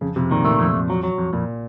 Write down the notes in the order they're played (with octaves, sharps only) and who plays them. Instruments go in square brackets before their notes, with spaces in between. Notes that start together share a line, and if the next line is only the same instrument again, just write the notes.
[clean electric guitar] F2 [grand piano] C#3
[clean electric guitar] F2 [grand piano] C3
[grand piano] A#2 [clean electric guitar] D#3
[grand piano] A#2 [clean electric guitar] A3
[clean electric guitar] F2
F2
F#3
F#3
F2
[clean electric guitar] F2 [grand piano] A#2